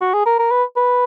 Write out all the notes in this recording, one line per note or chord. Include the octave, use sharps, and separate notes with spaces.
F#4
G#4
A#4
A#4
B4
B4